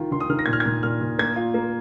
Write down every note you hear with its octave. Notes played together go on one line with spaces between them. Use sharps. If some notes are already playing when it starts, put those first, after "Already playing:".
Already playing: D#3 F4
D#3 C6
D#6
D#3 F6
A#6
A#2 G#6
F6
G#6
A#2
A#2 F6
A#2
A#3 G#6
F4
A#3